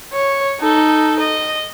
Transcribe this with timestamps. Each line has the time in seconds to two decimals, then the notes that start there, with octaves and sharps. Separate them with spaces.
0.13 C#5
0.60 D#4 A4
1.20 D#5